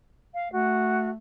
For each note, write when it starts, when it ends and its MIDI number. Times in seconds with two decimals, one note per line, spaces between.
0.34 0.51 77
0.52 1.16 57
0.52 1.09 66